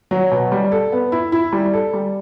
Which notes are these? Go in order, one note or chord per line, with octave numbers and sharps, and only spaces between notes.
F#3
B2
G3
A4
B3
E4
E4
G3
A4
G3